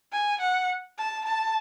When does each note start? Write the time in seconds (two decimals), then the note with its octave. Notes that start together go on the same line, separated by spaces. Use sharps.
0.12 G#5
0.41 F#5
0.98 A5
1.25 A5